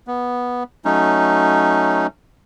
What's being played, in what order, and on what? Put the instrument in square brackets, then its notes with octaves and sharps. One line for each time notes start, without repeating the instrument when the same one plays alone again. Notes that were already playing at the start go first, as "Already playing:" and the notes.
[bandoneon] B3
F#3 A3 C#4 D#4